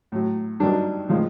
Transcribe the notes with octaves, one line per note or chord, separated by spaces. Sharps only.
A2 F#3
G2 D#3 F#3 D4
A2 F3 G#3